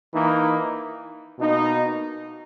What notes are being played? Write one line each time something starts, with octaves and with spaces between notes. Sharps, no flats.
E3 A#3 D#4
B2 A#3 D#4